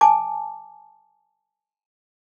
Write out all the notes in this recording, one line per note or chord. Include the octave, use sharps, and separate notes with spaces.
G#5 A5 D6